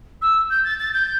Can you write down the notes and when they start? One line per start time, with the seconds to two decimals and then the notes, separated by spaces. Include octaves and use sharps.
0.21 E6
0.49 G6
0.64 A6
0.79 A6
0.93 G6